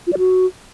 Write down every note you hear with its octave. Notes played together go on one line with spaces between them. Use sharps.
F4
D5
F#4